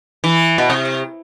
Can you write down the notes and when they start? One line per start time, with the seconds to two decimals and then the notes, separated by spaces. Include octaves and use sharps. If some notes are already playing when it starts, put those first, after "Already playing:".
0.24 E3
0.58 B2
0.70 C3